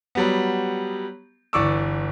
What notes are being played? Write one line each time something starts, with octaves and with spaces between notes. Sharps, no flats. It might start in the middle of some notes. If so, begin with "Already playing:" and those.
F#3 G3 B3
G1 E3 D5 C#6 D6 E6